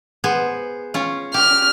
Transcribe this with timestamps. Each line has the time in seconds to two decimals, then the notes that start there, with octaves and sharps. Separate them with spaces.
0.24 B3 G#4 C5
0.94 C#4 F4
1.34 G4 F6